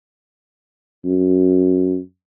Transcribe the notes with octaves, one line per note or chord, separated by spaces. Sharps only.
F#2